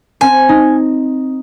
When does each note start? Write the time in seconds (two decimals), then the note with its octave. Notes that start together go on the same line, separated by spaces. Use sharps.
0.21 C4 G#5
0.49 D#4